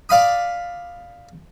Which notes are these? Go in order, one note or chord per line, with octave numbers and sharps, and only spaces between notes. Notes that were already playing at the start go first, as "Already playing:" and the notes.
D5 F5 B5 D#6